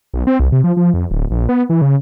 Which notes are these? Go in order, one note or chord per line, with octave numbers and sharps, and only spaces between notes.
B1
C4
C2
C3
F3
F3
F2
D1
A#1
B3
E3
C#3